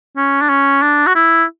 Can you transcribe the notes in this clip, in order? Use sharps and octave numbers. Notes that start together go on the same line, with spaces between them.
C#4
D4
C#4
D4
F#4
E4